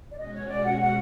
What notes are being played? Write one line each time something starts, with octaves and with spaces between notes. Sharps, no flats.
D5
B2 G#3 C#4 F#4 D#5
C#5
D5
F#5
F#5